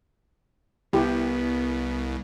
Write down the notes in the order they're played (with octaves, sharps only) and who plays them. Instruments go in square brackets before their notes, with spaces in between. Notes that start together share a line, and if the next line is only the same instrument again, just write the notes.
[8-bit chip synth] C2 [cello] B3 [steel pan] E4 G4